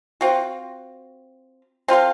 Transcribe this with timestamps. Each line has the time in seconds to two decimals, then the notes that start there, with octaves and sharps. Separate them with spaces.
0.21 C4 F4 F#4
1.88 C4 F4 A4 F5